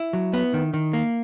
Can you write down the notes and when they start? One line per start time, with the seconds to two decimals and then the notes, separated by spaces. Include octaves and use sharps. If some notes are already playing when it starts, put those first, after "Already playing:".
Already playing: E4
0.13 F#3
0.33 B3
0.54 D#3
0.74 D#3
0.93 A#3